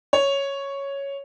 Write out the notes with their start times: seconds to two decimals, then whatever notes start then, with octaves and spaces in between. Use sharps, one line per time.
0.13 C#5